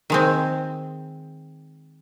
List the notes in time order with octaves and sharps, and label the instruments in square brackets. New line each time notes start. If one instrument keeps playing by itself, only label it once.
[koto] D#3 G#3 C4